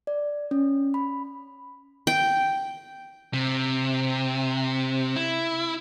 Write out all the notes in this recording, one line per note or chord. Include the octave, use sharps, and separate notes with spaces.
D5
C#4
B5
G5
C3
E4